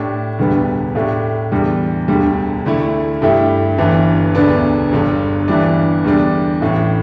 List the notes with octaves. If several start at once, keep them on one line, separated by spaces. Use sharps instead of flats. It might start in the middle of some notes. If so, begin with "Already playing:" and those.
Already playing: A2 A3 D4 G4
E1 D2 D3 G3 B3
A2 A3 D4 G4
E2 D3 G3
E1 D2 D3 G3
D2 D3 A3 E4
G2 D3 A3 E4 G4
G1 G2 E3
E1 D2 D3 B3 D4
G1 G2 D3
G1 G2 E3 G3 D4
E2 D3 G3 D4
A1 A2 E3